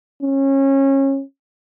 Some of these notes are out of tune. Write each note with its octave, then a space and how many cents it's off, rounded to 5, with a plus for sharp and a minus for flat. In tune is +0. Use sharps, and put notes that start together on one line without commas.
C#4 -25